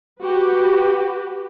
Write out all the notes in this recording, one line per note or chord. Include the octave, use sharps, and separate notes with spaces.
F#4 G4 B4